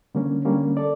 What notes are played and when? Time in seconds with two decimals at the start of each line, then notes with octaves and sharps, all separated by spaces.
0.15 D3 G3 A#3 C#4
0.45 D3 G3 A#3 C#4
0.77 A4 D5